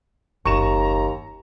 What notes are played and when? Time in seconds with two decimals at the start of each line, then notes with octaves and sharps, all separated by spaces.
0.45 F#1 D#2 A#5 C#6 E7